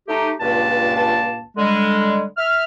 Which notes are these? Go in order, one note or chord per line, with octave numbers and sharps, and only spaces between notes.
A3 D#4 G4
C#2 G2 A#2 A#3 B4 A5
D3 G3 G#3
E5 F6